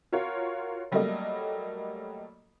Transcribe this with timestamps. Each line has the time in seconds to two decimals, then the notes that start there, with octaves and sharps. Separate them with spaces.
0.12 F4 F#4 A#4 C#5 F5
0.92 F#3 G3 A3 A#3 A4 D#5